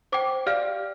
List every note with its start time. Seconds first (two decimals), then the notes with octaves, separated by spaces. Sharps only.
0.12 C5 G5 D6
0.46 G4 D5 F5 F6